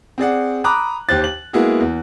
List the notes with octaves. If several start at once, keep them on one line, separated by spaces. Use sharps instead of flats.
C4 G#4 D5 F#5
A#5 B5 D6 D#6 F#6
D#2 G4 C5 F#6 A6
F#7
G#3 A#3 B3 E4 F#4 G#4
E2